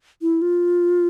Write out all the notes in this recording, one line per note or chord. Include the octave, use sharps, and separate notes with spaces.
E4
F4